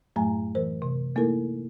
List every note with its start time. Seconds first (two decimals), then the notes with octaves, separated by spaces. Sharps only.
0.16 F#2 A2 F#3 A3 G#5 A#5
0.55 E3 A#4 C5
0.82 C3
1.15 A3 A#3 D#4 E4 A4 A#4